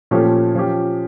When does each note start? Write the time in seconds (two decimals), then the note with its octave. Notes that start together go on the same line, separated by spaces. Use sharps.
0.11 A#2 F3 A3 C#4 G4
0.55 F3 C#4 G4